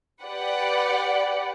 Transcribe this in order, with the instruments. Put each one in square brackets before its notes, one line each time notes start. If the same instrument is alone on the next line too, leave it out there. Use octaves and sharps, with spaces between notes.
[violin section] G4 B4 D5 F#5